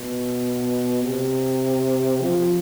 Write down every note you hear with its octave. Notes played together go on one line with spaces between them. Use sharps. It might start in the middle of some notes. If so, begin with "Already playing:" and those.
Already playing: B2
C3
F3